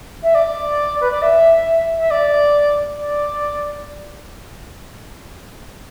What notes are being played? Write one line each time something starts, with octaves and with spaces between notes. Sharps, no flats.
E5
D5
B4
D5
E5
E5
D5
D5